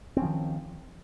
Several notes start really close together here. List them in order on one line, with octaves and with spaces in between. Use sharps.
C4 C#4 F3 D#3